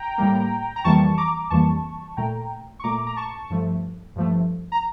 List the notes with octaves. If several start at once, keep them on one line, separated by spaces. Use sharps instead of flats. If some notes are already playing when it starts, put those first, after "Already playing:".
Already playing: G5 A#5
A2 G3 A#3
A#5
F2 E3 G3 A#3 A5 C#6
A#5 D6
F2 E3 G3 A#3 A5 C#6
A#2 A3 G5 A#5
C#6
A#2 A3 A#5 D6
A#5
A5 C#6
G2 F3 A3
G2 F3 A3
A#5